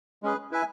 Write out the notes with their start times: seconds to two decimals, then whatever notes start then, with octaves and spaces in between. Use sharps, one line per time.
0.23 G#3 C#4 G#4 B4
0.51 E4 B4 E5 G#5